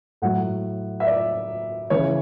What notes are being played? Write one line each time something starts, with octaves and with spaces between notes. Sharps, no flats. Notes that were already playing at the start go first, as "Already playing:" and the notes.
A2 F#3 F#5
E5
D5
C#3 E3 C#5